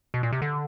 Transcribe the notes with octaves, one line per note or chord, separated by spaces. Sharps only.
B2
A#2
C3
D3